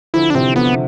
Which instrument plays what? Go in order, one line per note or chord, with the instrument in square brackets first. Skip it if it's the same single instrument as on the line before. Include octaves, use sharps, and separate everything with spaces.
[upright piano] D3 F3 [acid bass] E4
[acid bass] D4
[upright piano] C3 E3 [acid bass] C4
[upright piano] D3 F3 [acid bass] B3